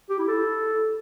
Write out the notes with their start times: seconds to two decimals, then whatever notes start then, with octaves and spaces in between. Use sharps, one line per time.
0.10 G4
0.19 E4
0.28 A4